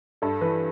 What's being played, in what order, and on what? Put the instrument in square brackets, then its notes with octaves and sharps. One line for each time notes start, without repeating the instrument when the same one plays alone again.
[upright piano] G2 [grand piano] A4
[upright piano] E3 [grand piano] B4